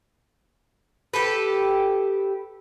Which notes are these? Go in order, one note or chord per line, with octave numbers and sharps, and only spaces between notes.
G4 A4 B4